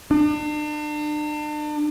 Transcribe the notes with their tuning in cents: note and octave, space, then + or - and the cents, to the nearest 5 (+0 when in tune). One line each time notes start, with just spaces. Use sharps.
D4 +40